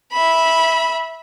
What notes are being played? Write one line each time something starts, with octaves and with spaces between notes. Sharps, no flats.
E5 B5